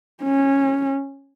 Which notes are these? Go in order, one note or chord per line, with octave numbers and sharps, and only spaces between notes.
C#4